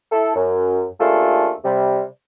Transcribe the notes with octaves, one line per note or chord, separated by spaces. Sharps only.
E4 A4
F#2
D#2 A3 D4 F4 G#4 A4
C3 G3